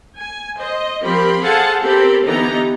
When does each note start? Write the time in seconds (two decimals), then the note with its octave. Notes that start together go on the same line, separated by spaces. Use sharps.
0.16 G#5
0.57 C5 D#5
1.02 F3 C4 G4 A#4 B5 C6
1.41 G#4 A4 C5 F5 F#5 A5
1.82 C4 G4 A4 A#4 C5 B5
2.25 D3 E3 B3 D#4 G4 A#5